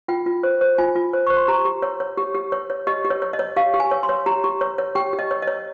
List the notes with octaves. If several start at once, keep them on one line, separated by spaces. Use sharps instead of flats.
F4 G5
F4
C5
C5
F4 G#5
F4
C5
C5 C#6
C6
G4 A#5
G4
C#5
C#5
G4
G4
C#5
C#5
G4 D#5
G4
C#5
C#5
D#5
C#5
G4 F5
G4
G#5
C#5
C6
C#5
G4 A#5
G4
C#5
C#5
G4 G5
G4
D#5
C#5
D#5
C#5